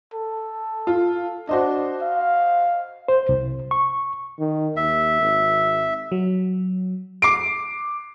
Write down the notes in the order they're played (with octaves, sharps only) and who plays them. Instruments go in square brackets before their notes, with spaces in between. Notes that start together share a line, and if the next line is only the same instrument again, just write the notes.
[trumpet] A4
[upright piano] F4
[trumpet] D4 [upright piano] F#4 C5 D#5
[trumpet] F5
[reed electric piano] C5
C2
C#6
[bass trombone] D#3
[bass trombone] D#2 [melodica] E5
[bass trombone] G#1
[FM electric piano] F#3
[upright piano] D6 C7 D7